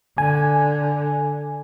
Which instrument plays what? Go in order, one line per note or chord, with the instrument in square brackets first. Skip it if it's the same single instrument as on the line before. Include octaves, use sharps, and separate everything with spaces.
[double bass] D3 [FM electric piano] G#5